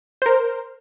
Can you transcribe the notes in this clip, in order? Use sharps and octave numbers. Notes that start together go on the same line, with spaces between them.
A#4 C5